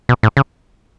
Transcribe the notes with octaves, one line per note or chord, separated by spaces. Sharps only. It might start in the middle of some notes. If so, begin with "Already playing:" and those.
B2
A2
C#3